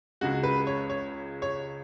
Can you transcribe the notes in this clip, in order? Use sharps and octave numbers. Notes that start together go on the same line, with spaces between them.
C#2 C#3 G#3 F#4
B4
C#5
C#5
C#5